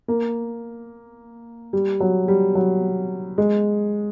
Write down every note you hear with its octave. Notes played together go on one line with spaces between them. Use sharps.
A#3
G3
F#3
G3
F#3
G#3